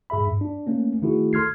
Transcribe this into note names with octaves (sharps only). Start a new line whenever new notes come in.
G#2 G#4 E5 B5
G2
D4
A3 A#3 C#4
D#3 A3 E4 F#4 G#4
A4 C6 F6 G#6 C7